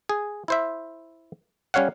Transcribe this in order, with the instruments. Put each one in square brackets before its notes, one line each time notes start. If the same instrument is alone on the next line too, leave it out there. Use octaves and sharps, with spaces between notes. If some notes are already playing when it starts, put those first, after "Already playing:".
[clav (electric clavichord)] G#4
E4 C5 E5
G3 C#4 C#5 F5 F#5